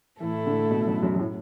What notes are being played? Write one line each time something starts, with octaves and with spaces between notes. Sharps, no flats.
A2 E3 A3 E4 A4
D3
B2
F#2
F#2
F#2
A2